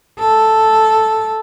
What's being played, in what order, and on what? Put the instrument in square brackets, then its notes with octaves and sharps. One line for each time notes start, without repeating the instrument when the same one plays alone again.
[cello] A4